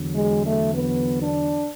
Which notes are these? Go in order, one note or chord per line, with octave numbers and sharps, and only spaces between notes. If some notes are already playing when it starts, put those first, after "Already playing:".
Already playing: E2 D3 F#3
G#3
A3
B3
D4